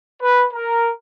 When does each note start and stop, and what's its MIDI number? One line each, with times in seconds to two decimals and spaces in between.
0.20 0.46 71
0.53 0.89 70